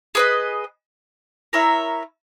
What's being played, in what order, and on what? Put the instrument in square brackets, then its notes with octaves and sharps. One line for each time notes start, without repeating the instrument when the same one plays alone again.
[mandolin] G#4 B4 D#5
E4 A#4 C#5 E5